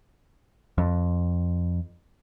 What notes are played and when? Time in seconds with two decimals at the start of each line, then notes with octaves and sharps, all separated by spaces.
0.78 F2